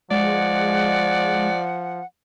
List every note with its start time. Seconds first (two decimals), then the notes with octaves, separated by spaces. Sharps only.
0.11 F3 G#3 D5 F#5